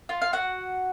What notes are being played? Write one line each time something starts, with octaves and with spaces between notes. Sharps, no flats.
F4 F5
F5
F#4 F#5